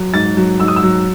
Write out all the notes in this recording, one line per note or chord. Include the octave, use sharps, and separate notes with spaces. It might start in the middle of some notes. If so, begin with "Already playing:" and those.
Already playing: F#3
G#2 A6
F#3
G#2 E6
D#6
E6
F#3